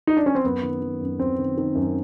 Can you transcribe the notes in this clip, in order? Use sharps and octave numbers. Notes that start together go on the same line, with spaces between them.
D#4
D4
C#4
C4
F#2 B3
D#3
D#3
F#2
F#2 C4
D#3
D#3
F#2